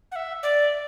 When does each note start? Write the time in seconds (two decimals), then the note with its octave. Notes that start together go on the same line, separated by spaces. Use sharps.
0.12 F#5
0.16 E5
0.43 D5